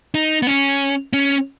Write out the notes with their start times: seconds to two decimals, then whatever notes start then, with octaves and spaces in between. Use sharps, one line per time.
0.14 D#4
0.42 B3
0.47 C#4
1.13 C#4